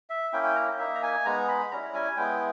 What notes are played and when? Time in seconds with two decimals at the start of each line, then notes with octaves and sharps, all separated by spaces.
0.10 E5
0.33 A#3 C#4 E4 G5
0.44 G5
0.55 A#5
0.78 A#3 D#4 E5
0.95 A#5
1.02 G#5
1.25 G#3 B3 D#4 A#5
1.48 B5
1.71 G3 C#4 E4 A#5
1.94 G#5
2.17 G#3 B3 E4 G5